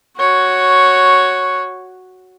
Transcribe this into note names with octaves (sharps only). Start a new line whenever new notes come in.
F#4 C#5